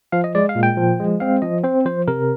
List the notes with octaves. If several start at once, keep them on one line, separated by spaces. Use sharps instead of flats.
F3 F5
D#5
G#3 D5
F5
A#2
G5
F3
G#3
C4 F5
F3 D#5
C4 C5
F3 C5
C3 A#4